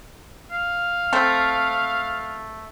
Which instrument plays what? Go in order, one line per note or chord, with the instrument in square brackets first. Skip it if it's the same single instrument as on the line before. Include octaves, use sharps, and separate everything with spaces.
[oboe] F5
[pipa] A3 C4